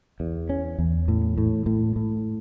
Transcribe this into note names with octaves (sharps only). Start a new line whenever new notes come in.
E2
C#4
E2
A2
A2
A2
A2